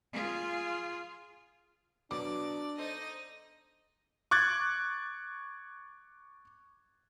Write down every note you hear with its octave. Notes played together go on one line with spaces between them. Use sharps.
F4 G#4
B2 F#3 B3 D4 D5 D6
D#4 A4 C5 D#5
C#6 D6 F#6 G#6 A6